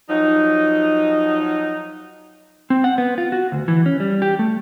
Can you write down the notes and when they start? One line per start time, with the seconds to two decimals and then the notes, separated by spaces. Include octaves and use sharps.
0.09 F3 F#3 D#4
2.70 C4
2.84 F#5
2.98 B3
3.18 F4
3.32 F#4
3.52 D2
3.68 E3
3.86 C#4
4.00 G3
4.22 G4
4.39 A3